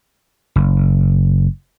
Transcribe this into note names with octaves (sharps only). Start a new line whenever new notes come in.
F#1